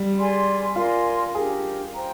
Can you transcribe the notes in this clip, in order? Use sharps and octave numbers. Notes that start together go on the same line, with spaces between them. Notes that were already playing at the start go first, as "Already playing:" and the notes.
Already playing: G3
G#4 D5 G#5 C6
F4 A#4 D5 G#5 C6
D4 G4 G#4 A#4
C5 G5 A#5